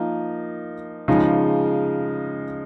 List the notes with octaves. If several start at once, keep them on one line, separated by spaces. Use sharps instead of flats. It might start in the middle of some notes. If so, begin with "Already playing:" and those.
Already playing: F3 A#3 D#4 A#4
C#3 F3 G#3 D#4